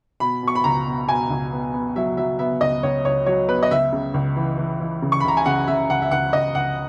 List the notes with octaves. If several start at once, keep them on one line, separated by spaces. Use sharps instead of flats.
B2 B5
B2 C#6
B5
C#2 A#5
B2
B2 G#5
C#2
B3
B3
F#3 E5
F#3 E5
B3 E5
C#2 D#5
C#2 C#5
C#2 C#5
F#3 C#5
B3 B4
D#5
C#2 E5
C#3
C#2
E3
E3
E3
C#3
C#6
B5
C#2 A#5
G#5
C#3 F#5
C#3 E5
C#2 F#5
E5
C#2 F#5
C#2 D#5
C#2 F#5